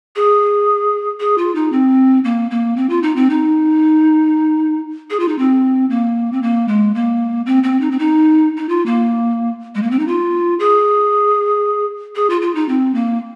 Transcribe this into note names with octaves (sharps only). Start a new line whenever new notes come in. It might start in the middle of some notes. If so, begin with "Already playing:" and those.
G#4
G#4
F4
D#4
C4
A#3
A#3
C4
F4
D#4
C4
D#4
G#4
F4
D#4
C4
A#3
C4
A#3
G#3
A#3
C4
C4
D#4
C4
D#4
D#4
F4
A#3
G#3
A#3
C4
D#4
F4
G#4
G#4
F4
F4
D#4
C4
A#3